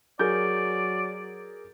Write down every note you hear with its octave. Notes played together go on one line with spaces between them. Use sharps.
F#3 G#4 A#4 D5 G6